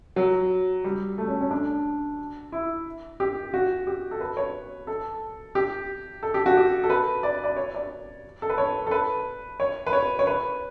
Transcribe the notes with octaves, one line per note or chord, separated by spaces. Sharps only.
F#3
G3
A3
C#4
C#4
D4
E4
G4
F#4
G4
A4
B4
C#5
A4
G4
A4
G4
F#4
G4
A4
B4
D5
D5
C#5
D5
A4
B4
C#5
A4
B4
C#5
B4
C#5
C#5
B4